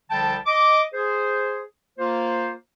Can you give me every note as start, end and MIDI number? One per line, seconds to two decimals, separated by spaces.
0.10 0.36 36
0.10 0.36 50
0.10 0.36 53
0.10 0.36 55
0.10 0.36 79
0.10 0.36 81
0.46 0.82 75
0.46 0.82 86
0.94 1.61 68
0.94 1.61 72
1.99 2.52 58
1.99 2.52 65
1.99 2.52 72